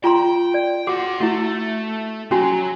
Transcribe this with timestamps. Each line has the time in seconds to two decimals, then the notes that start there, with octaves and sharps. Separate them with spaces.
0.04 F4 G5 A#5 C6
0.54 D5
0.87 F#4 G#4 F#5 D6
1.21 A3 E4 F#4
2.31 F#3 C#4 F#4 G#5